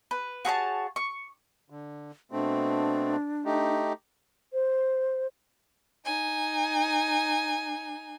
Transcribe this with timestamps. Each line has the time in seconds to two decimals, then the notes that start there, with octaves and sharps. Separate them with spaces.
0.11 B4
0.45 F#4 G#4 C#5 A5
0.96 C#6
1.70 D3
2.32 B2 A3 C4 D4
3.45 A3 D#4 G4
4.53 C5
6.05 D#4 G#5